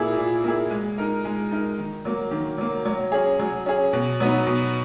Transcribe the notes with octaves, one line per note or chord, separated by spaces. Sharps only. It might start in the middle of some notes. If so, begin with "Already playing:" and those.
Already playing: A#2 A#3 E4 G#4
A#2
A#3 E4 G#4
G#3
D#4 A#4
G#3
D#4 A#4
D#3
F#3 A#3
D#3
F#3 A#3
F#3
C#4 G#4
F#3
C#4 G#4
B2
F#3 B3 D#4
B2